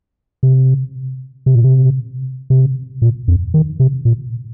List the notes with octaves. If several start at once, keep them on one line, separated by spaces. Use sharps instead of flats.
C3
C3
A#2
C3
C3
A#2
F2
D#3
C3
A#2